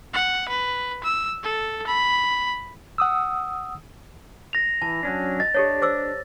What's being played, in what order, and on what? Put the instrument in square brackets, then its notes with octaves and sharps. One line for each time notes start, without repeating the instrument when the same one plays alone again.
[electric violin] F#5
B4
E6
A4
B5
[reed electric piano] F#5 D#6 E6
[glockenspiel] A#6 F7
[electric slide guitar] E3 [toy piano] A5
[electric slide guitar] F#3 C#4 D4
[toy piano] D#5 [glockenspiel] A6
[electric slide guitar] D4 [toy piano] G4 A4 C#5
[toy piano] C5 D6 E6